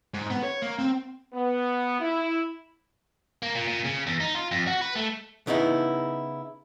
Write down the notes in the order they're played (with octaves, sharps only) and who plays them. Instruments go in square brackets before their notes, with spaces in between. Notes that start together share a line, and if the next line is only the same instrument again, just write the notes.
[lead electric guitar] G#2
B3
C#5
A#3
C4
[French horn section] B3
E4
[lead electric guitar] A#3
A#2
A#2
C#3
E2
D#4
F4
F2
F#4
B4
A3
[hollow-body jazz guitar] C#3 B3 D#4 E4